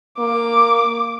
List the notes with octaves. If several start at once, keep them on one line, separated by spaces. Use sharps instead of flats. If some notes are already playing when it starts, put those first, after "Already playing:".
A#3 D6